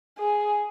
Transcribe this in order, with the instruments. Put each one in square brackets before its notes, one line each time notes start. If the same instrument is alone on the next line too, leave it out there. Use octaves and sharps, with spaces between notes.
[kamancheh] G#4